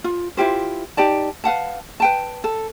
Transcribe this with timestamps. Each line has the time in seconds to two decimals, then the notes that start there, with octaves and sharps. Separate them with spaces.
0.04 F4
0.37 E4 F4 G4 C5
0.97 D#4 G4 D5 A5
1.44 B4 F5 F#5 A5
2.00 B4 G5 A5
2.44 A4